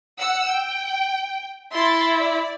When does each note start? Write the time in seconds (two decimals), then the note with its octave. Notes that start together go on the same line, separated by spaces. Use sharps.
0.18 F#5 E6
0.51 G5
1.73 E4 C6 A6
2.19 D5